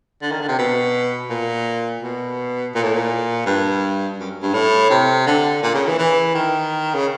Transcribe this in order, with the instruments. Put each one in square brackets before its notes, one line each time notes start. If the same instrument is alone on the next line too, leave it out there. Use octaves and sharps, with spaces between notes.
[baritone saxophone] D3
D#3
D3
C3
B2
A#2
B2
A#2
A2
A#2
G2
F#2
G2
A2
C3
D3
A#2
C#3
E3
E3
D#3
C#3